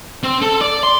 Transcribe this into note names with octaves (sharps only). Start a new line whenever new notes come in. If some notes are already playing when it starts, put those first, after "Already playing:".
C4
A4
D5
C6